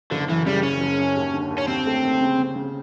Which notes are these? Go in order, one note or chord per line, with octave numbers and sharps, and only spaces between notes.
F#1 D3
F#2 E3
C#3 G3
F#1 C#4
F#1
F#2
D#2
D3
D#2
C#4
D#2 C4
A3
D#2
C#3
C#3
C#3